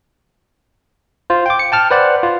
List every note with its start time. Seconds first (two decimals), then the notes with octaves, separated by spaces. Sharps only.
1.30 F4 C5
1.46 G5 D6
1.59 C#7
1.72 G5 A5 F6
1.91 B4 C5 D5 F#5
2.23 F4